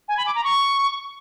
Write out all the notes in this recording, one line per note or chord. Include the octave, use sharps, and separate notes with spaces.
G#5
B5
D6
A#5
C#6